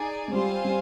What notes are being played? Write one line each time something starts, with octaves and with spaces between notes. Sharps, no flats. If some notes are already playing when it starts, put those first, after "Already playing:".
Already playing: D#4 G#4 D5
G#3
G3 C4 F4 C5 F5 G#5
G3